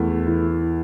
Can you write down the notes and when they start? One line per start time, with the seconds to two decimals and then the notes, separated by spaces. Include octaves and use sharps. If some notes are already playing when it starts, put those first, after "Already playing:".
Already playing: E2 A3
0.27 E3